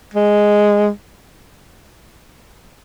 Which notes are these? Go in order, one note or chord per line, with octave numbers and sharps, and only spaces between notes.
G#3